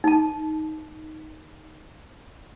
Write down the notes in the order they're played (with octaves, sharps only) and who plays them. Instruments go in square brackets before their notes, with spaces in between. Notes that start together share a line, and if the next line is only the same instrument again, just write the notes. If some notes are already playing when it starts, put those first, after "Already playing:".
[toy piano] D#4 A5